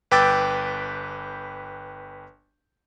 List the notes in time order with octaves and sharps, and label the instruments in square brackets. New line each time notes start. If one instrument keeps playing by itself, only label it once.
[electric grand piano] G1 B4 G5 D6 E6 A6